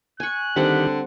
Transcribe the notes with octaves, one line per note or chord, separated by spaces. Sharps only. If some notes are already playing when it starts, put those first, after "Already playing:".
G#5 C#6 F#6
D3 D#3 G3 C4 G4 F#5